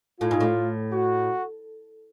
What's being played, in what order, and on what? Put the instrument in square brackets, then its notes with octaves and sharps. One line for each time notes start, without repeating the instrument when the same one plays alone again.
[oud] A2 [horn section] F4
[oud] G#2
A2
[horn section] F#4